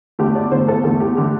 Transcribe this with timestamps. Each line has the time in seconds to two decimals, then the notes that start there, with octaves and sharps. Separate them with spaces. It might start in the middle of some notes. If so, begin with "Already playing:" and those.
0.19 E2 D3 A3 G4
0.35 D5
0.51 E2 D3 A3 C5
0.68 A4
0.84 E2 D3 A3 A4
1.00 G4
1.17 D3 A3 G4